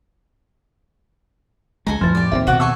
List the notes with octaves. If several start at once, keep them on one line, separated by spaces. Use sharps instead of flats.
C#2 G#3 A4 G#5 A#5
F2 A2 E3 F3 A6
G4 D5
A#1 D#2 G3 C4 E5
B2 F#4 F#5 D6
A4 F#5 G#5 C#6 E6